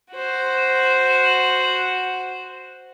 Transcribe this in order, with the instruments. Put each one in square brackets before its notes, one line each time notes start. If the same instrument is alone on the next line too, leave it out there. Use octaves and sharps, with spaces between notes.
[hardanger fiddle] F#4 C5